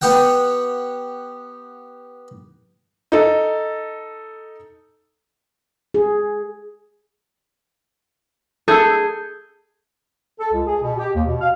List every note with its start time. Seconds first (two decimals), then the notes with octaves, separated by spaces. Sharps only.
0.02 B3 G4 F#5 G5
3.12 D#4 A4
5.94 G#4
8.68 G#4 A4 G6
10.40 A4
10.52 C#2
10.66 G#4
10.82 B2
10.98 G4
11.14 D#2
11.27 B2
11.41 F5